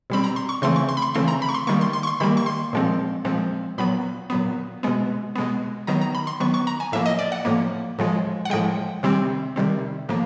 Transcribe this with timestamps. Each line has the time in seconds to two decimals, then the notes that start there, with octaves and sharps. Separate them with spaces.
0.10 B2 G3 C4 B5
0.24 A#5
0.36 C6
0.49 C#6
0.62 C#3 E3 A3 C4 C6
0.76 C#6
0.89 C6
0.97 B5
1.02 C6
1.15 C#3 E3 A3 C4 C6
1.28 A#5
1.42 B5
1.49 C#6
1.55 C6
1.67 D#3 G3 A#3 C#6
1.81 C6
1.93 C6
2.03 C#6
2.07 C6
2.20 D#3 G3 A#3 B5
2.37 C#6
2.46 C6
2.73 A#2 F3 G#3 C4
3.25 A#2 F3 G#3 C4
3.78 A#2 F#3 B3 B5
4.30 A#2 F#3 B3
4.83 B2 G#3 B3
5.36 B2 G#3 B3
5.87 D#3 F#3 B3 A#5
6.01 A#5
6.15 B5
6.27 C6
6.40 D#3 F#3 B3 C#6
6.54 C#6
6.67 A#5
6.80 G#5
6.92 A2 F3 A#3 E5
7.06 D#5
7.19 D5
7.32 F#5
7.45 A2 F3 A#3
7.99 A2 F3 G#3
8.45 F#5
8.50 A2 F3 G#3 G5
9.03 C3 D#3 G3 C4
9.56 C3 D#3 G3 C4
10.09 A2 F3 A#3